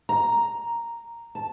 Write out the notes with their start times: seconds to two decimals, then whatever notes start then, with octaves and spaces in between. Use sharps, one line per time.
0.09 A#5
1.35 A5